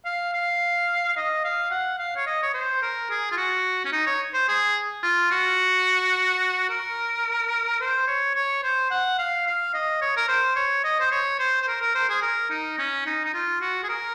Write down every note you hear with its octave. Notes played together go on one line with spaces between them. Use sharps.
F5
F5
D#5
F5
F#5
F5
C#5
D#5
C#5
C5
A#4
G#4
F4
F#4
C#4
D#4
C#5
C5
G#4
F4
F#4
A#4
C5
C#5
C#5
C5
F#5
F5
F5
D#5
C#5
A#4
C5
C#5
D#5
C5
C#5
C5
C5
A#4
A#4
C5
G#4
A#4
D#4
C#4
D#4
D#4
F4
F#4
G#4
A#4